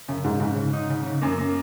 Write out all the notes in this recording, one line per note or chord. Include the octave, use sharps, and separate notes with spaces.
F#2 C#3
C#2 G#2
G#2 C#3
C#3
D#4
C#3
C#3
F#2 A#3
A#3